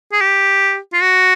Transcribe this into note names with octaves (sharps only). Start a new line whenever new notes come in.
G#4
G4
F4
F#4